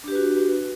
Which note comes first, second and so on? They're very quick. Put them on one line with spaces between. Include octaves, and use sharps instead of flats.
D4 G4 B4 F#4